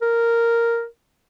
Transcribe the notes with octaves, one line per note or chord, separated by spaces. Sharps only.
A#4